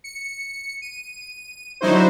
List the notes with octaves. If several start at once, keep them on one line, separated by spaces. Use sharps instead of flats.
C#7
D#7
D3 F#3 D#4 E4 F#4 C5